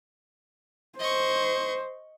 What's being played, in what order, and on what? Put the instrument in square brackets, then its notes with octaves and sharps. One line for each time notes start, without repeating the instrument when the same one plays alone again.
[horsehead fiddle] C5 [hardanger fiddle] D#5 C#6